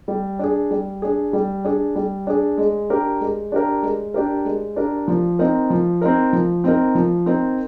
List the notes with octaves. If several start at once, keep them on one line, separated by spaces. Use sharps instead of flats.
G3
D4 G#4
G3
D4 G#4
G3
D4 G#4
G3
D4 G#4
G#3
D4 G4 A#4
G#3
D4 G4 A#4
G#3
D4 G4 A#4
G#3
D4 G4 A#4
F3
C4 D#4 A#4
F3
C4 D#4 A#4
F3
C4 D#4 A#4
F3
C4 D#4 A#4